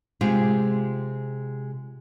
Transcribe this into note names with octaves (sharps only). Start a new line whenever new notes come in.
C3 G#3 F4 G4 G#4